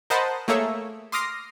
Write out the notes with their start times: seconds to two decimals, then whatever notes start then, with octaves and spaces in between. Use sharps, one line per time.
0.10 A#4 C5 D#5 F#5 A5 B5
0.48 A3 A#3 G#4 A4 C#5 E5
1.12 C6 D6 D#6 F6 A#6 C7